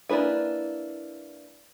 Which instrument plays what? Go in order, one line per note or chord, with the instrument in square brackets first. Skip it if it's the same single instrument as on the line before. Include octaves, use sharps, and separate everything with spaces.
[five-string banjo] A#3 D4 E4 B4 G#5